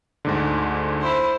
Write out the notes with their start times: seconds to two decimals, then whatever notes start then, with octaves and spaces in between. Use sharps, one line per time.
0.25 D2 G#2 D3
1.01 E4 C5